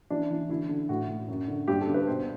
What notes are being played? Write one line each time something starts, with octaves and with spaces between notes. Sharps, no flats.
E3 D4
E3
D3 E4
D3
A2 F#4
A2
F#2
D3
G2 G4
A4
D3
B4
B2 C5